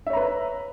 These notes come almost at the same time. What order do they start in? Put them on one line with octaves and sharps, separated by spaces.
E5 C#5 A#5 B4